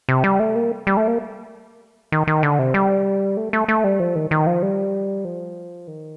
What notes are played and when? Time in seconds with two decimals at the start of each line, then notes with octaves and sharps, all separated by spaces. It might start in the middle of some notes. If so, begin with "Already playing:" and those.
0.09 C3
0.24 G3
0.40 A3
0.55 A#3
0.87 G3
0.97 A3
1.08 A#3
2.12 D#3
2.27 D#3
2.43 D3
2.59 C3
2.74 G3
3.37 A3
3.53 A3
3.68 A3
3.84 G3
4.00 F3
4.15 D#3
4.31 D#3
4.47 F3
4.62 G3
5.25 F3
5.88 D#3